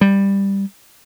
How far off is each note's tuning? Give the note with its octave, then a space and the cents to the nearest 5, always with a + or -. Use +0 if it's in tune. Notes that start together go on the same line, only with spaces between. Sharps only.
G3 +10